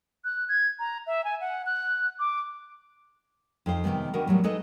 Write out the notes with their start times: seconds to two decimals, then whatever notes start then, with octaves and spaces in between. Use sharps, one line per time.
0.25 F#6
0.49 G#6
0.79 A#5
1.07 E5
1.24 G#5
1.41 F#5
1.66 F#6
2.19 D6
3.66 F2 D#4 C5 F5
3.84 C3 D#3 G3 G#3 B3
4.13 D#3 G#3 B3 D4 F#4 A#4
4.27 A2 F#3 G3 B3
4.44 G#3 D#4 A4 B4 D#5